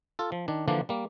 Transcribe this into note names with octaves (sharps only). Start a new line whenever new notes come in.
F4 A4
F3
D#3 D4
D3 E3 F3 A#3 D4
G3 A#3